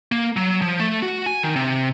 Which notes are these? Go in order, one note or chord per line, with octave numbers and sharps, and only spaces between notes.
A#3
F#3
F3
A3
F#4
G#5
D#3
C3